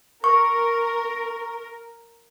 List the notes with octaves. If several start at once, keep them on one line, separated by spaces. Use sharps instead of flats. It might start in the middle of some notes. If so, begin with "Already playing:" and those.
A#4 C#6